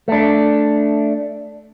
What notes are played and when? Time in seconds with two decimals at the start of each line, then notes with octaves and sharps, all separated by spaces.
0.08 A3 D4